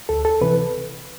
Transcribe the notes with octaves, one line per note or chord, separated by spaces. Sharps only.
D2 A4
A4
C3 E3 B4